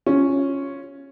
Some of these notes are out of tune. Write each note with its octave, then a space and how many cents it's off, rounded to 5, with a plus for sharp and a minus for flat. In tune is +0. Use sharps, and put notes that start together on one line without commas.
C#4 -5 F4 +0